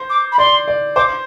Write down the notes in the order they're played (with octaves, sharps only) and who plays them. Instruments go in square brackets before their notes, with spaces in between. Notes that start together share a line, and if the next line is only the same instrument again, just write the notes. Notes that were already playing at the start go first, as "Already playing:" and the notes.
Already playing: [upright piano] C5
[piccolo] D6
B5
[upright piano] D5 [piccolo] C6
[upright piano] D5
[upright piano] C5 [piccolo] D6